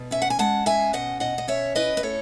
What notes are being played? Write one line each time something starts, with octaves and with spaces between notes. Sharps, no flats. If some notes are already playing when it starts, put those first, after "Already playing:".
Already playing: B2
C#4 E5
F#5
G#5
G#3 F#5 A5
C#4 E5 G#5
B2 D#5 F#5
B2 D#5 F#5
D#5
C#4 C#5 E5
E4 B4 D#5
B4
A2 A4 C#5